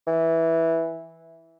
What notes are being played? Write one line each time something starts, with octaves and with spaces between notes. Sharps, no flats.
E3